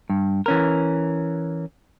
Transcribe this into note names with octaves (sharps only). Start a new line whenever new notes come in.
G2
E3 C#4 A#4